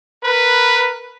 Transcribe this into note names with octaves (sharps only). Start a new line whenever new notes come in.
A#4 B4